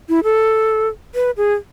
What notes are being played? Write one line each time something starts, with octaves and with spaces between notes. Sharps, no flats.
E4
A4
B4
G#4